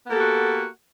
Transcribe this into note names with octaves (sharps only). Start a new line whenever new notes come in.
A#3 B3 F#4 G4 A4